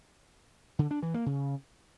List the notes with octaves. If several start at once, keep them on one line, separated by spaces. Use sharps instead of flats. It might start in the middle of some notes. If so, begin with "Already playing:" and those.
D3
D4
E3
A#3
C#3